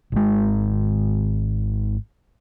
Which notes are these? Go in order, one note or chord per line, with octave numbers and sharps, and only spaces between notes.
G#1 G#3